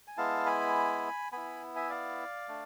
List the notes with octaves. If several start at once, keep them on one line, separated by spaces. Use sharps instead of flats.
G#5
G#3 B3 E4 F5 A5
G#5 B5
B3 E4 G#5 B5
E5 G#5
D5 F5
A3 D4